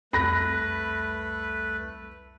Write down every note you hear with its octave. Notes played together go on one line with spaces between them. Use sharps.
C2 F2 A3 B4 B5 F#6 A#6